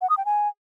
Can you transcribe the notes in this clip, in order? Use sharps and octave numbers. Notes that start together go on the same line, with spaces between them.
F#5
D#6
G5
G#5